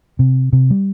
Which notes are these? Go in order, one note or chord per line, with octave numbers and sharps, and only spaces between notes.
C3
C3
G3